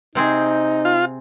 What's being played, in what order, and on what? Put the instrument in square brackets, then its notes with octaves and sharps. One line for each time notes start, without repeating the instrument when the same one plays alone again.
[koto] C3 C4 G#4 [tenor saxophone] D#4
[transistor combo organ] F4